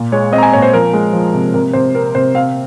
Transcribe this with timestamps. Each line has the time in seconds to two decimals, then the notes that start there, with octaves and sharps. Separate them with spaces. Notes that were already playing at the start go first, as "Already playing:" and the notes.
Already playing: A#2
0.12 G#3 C#5
0.32 C4 D#5
0.38 A#5
0.43 G#5
0.53 A#2 C#5
0.62 C5
0.73 F3 A#4
0.93 G#3
1.13 F3
1.33 C3
1.54 C3 A#4
1.73 C3 C5
1.95 C4 A#4
2.14 C3 C5
2.34 C4 F5